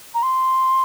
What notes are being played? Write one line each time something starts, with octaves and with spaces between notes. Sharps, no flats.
A#5
C6